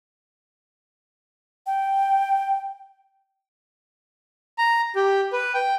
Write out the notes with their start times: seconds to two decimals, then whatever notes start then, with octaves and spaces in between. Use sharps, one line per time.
1.67 G5
4.58 A#5
4.95 G4
5.32 B4
5.54 G5